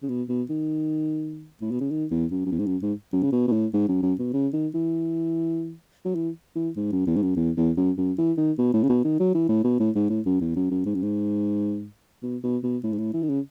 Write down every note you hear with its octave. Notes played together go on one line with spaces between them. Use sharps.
C#3
B2
B2
D#3
A2
B2
C#3
D#3
E2
F#2
F#2
E2
G#2
F#2
G#2
F#2
C#3
B2
B2
A2
G#2
F#2
F#2
B2
C#3
D#3
E3
F#3
E3
E3
G#2
F#2
E2
G#2
F#2
E2
E2
F#2
F#2
E3
D#3
B2
A2
C#3
B2
D#3
F#3
E3
A2
B2
A2
G#2
A2
F#2
E2
F#2
F#2
G#2
F#2
G#2
B2
B2
B2
A2
G#2
A2
E3
D#3
C#3